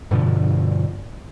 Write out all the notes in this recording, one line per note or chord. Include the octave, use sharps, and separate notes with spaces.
G2 B2 D3 F3